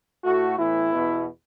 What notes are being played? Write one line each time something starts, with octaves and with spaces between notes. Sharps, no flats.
A2 A3 F#4
A2 E3 B3 E4
E2 B2 B3